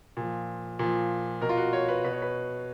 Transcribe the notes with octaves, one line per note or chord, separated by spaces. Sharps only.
A#2 F3
A#2 F3
B2 A#4
F4
F#4
C#5
B4
B2 B4
C#5
B4